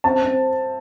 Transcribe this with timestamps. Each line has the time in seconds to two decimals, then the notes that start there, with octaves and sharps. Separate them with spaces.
0.04 C4 A5
0.22 C4